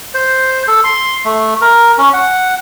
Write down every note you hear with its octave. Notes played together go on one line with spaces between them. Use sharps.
C5
A4
C6
A3
A#4
C#4
F#5